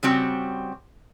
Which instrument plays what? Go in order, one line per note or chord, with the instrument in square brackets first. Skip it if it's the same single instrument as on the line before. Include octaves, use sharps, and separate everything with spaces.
[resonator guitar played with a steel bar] C#3 G3 C4 F#4